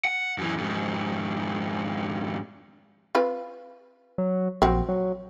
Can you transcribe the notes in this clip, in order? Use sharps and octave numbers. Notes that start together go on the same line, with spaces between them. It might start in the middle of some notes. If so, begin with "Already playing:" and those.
F#5
F#2 E3
F2 G#2
C4 F4 B4
F#3
A#1 C4 F#4
F#3